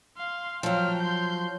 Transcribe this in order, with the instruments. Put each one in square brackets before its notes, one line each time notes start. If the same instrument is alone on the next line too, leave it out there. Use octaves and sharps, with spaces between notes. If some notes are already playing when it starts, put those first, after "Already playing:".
[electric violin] F5 C6
[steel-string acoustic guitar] F3 F#3 [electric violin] G5 F6
[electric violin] C6 G6